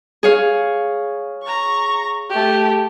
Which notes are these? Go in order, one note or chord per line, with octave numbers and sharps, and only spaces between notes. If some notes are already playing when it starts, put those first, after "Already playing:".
G#4 C#5 F5
A#5 C#6
A3 G4